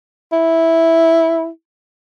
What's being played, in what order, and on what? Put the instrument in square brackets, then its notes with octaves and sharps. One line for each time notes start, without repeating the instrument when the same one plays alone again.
[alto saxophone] E4